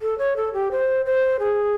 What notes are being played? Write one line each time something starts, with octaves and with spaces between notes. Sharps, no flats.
A4
C#5
A4
G4
C5
C5
G#4